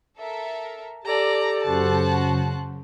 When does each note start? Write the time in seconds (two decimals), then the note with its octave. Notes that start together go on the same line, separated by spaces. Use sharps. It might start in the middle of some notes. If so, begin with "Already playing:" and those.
0.18 A4 A#4 E5
1.05 G4 A4 D5 A5 A#5
1.63 F#2 C#3 F#4 C5 A5 F#6